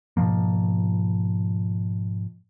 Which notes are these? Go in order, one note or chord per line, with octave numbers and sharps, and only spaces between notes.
G#2 B2 F3 A#3